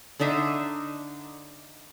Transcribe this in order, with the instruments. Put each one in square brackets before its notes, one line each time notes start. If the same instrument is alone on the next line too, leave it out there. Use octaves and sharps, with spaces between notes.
[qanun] D3 D4 D#4 E5